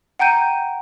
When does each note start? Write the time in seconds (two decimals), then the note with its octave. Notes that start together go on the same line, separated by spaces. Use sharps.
0.19 F#5 G5 A#5 G6 D#7